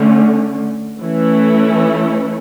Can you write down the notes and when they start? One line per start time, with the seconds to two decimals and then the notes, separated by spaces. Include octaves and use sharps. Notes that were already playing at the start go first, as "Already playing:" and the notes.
Already playing: D3 A3 C#4
1.00 E3 A3 C#4 E4 A4